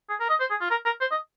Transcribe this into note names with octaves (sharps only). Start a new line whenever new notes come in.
G#4
A#4
D#5
C5
G#4
F4
A#4
A#4
C5
D#5